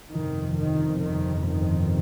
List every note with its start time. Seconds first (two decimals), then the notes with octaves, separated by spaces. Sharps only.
0.13 G1 F2 C3 D#3
0.57 D#3
1.01 D#3
1.45 D#3